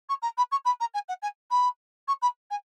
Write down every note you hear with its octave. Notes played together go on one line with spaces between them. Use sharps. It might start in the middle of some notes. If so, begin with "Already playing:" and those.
C#6
A#5
B5
C#6
B5
A#5
G#5
F#5
G#5
B5
C#6
B5
G#5